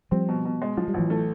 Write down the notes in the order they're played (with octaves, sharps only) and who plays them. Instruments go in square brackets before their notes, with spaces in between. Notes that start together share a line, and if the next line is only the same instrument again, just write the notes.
[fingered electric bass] F3 G3 [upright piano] C4
[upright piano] B2
B2
G#3
[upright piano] F3 [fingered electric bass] F#3
[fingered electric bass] G3
[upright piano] A1 [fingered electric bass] E3 F#3
[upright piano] A3